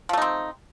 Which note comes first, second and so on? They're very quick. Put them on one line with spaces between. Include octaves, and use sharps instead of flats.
F3 A3 D#4 C4